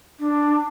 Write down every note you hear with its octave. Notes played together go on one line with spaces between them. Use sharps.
D4